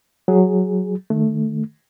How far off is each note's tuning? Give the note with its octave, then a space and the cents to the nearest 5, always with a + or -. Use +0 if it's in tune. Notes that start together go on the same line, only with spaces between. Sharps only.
F#3 +0 G#4 +0
D#3 -30 A3 +0